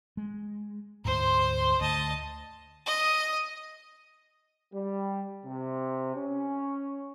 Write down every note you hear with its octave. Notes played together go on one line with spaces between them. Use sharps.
G#3
D2 G#2 C5 C6
D2 D#5 A5
D#5
G3
C3
C#4